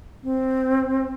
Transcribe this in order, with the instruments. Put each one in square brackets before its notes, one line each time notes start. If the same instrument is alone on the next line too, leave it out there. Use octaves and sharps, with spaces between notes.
[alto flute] C4